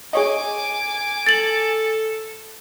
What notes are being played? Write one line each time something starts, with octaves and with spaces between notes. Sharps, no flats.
G#4 C#5 D#5 G#5 D6
A4 A6 F#7